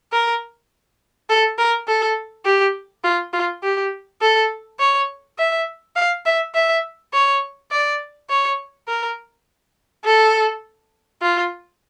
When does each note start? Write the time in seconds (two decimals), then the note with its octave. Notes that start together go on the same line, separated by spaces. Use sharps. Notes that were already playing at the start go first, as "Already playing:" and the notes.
0.12 A#4
1.30 A4
1.58 A#4
1.87 A4
2.45 G4
3.04 F4
3.33 F4
3.63 G4
4.21 A4
4.79 C#5
5.38 E5
5.96 F5
6.26 E5
6.55 E5
7.13 C#5
7.71 D5
8.30 C#5
8.88 A#4
10.05 A4
11.22 F4